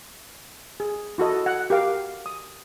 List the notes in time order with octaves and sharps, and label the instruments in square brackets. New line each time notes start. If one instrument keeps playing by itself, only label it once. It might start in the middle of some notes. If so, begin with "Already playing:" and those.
[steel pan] G#4
E4 F#4 A4 D#5
F#5
G4 A#4 F5 D6
D#6